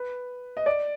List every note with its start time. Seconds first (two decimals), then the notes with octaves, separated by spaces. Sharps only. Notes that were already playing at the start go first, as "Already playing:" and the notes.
Already playing: B4
0.57 D#5
0.66 D5